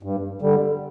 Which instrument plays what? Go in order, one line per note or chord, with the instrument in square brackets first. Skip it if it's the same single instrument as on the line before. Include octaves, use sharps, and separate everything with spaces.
[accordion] G2
D3 G3